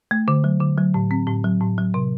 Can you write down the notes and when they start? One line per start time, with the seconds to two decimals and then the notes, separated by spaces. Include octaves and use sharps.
0.11 A3
0.28 D3
0.44 F#3
0.61 D3
0.78 F#3
0.94 A2
1.11 C4
1.27 A2
1.44 F#3
1.61 A2
1.78 F#3
1.94 C3